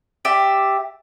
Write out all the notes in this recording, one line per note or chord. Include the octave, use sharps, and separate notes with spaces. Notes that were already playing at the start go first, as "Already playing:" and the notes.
G4 D5 E5